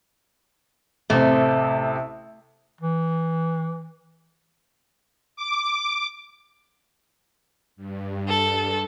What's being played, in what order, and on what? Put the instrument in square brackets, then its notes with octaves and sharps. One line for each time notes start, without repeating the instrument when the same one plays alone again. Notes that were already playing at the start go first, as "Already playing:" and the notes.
[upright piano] A1 C3 C4 [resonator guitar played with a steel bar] A3
[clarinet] E3
[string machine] D6
G2
[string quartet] A4